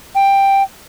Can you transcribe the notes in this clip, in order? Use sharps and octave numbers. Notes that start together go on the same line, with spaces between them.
G5